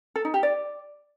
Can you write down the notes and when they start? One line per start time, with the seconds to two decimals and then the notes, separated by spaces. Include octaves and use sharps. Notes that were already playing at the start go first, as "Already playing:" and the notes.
0.16 A4
0.25 D#4
0.34 G4
0.43 D5